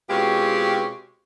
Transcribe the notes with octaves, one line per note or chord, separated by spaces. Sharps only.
B2 G#3 C4 C#4 F4 G4